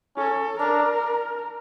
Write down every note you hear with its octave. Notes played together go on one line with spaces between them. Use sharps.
C#4 A4
D4 A#4